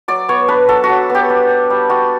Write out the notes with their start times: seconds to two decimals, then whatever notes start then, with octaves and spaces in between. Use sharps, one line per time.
0.08 F#3 D5
0.28 B3 C#5
0.48 D4 B4
0.69 F#3 A4
0.84 F#4
0.89 F#3
1.10 B3 G4
1.30 D4
1.49 D4
1.70 G3
1.89 G3 F#4